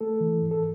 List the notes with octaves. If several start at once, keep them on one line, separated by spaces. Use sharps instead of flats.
A3 A4
E3
G#2
A4